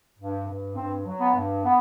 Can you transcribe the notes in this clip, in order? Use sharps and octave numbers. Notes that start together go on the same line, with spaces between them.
G2
G2
G2 C4
F#3
B3
G2
B3